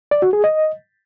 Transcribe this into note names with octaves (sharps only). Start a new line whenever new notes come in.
D5
F#4
G#4
D#5